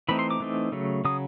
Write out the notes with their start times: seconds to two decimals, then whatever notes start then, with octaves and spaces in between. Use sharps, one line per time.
0.09 E3 A3 C4 D#4 B5
0.19 C6
0.30 D6
0.40 E3 A3 C4 D#4
0.72 C#3 F#3 A3
1.05 C#3 F#3 D#6